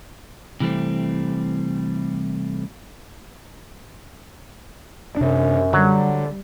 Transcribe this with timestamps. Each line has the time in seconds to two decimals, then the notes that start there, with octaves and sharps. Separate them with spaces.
0.60 C3 E3 G3 A3 C4
5.17 F#2 C3 D4
5.73 D3 F#3 G3